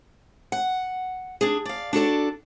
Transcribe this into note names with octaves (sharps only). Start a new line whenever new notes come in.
F#5
D4 G#4
D5 F5
D4 F#4 A4 D5